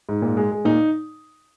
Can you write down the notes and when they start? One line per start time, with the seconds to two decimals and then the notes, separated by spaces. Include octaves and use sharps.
0.09 G#2
0.22 A#2
0.37 G#3
0.52 G#3
0.65 A#2 D#4